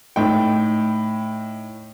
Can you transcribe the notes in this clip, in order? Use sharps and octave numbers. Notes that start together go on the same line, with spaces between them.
A2 D#4 G5